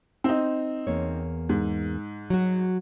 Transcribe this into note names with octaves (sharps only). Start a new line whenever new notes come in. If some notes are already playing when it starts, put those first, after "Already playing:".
C4 D#4
E2 A#3 C#5
G#2
F#3 F#4